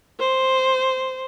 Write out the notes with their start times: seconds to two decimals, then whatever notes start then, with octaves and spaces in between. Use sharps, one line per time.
0.19 C5